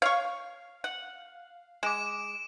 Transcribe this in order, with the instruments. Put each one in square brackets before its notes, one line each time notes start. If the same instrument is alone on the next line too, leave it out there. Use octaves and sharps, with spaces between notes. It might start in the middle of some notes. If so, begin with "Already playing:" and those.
[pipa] C#5 C#6 [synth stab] F5
[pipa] F#5
[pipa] G#3 [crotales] D6 D7 E7